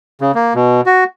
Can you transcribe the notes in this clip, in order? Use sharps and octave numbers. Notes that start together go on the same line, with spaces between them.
C#3
A#3
B2
F#4